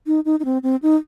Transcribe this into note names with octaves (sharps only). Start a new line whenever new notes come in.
D#4
D#4
D#4
C4
C4
D#4